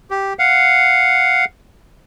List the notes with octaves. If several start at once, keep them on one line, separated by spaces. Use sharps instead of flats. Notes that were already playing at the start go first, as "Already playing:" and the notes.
G4
F5 F#5